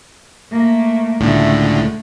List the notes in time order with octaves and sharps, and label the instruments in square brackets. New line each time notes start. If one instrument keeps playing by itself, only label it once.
[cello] A3 A#3
[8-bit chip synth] C#2 A2 D3 [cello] A3